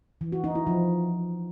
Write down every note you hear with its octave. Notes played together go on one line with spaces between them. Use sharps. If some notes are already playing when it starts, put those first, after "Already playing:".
E3
F#4
D#4
E4
F3